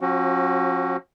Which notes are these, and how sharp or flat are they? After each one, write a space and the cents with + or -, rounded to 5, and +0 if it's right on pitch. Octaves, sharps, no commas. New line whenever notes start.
F3 +35 C#4 -40 F#4 +15